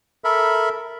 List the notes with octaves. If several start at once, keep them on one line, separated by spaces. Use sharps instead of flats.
A4 A#4 E5 B5